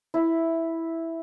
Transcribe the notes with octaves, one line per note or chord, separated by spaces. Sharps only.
E4